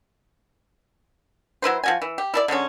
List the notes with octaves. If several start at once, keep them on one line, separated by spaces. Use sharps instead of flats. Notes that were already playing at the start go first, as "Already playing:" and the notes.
F#3 E4 B4 C5
F3 F#4 G#5
E3
G4
E4 A4 D5
D3 F#3 G#3 C#4